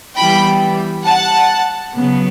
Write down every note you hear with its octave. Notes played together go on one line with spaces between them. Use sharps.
E3 G3 B3 G5 B5
F#5 A5
C#3 F#3 B3